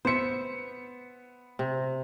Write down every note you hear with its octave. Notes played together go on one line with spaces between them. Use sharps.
B3 C5 E5 C#7
C3